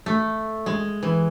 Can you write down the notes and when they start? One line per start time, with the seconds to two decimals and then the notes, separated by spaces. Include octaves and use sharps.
0.06 A3
0.66 G#3
1.03 E3